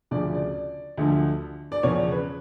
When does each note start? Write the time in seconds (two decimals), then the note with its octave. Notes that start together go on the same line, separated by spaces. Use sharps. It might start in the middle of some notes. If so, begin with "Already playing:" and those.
0.11 D2 C#3 F3 D5
0.34 D5
0.97 D2 D3 F3
1.72 D5
1.83 E2 C#3 F3 C#5
2.12 B4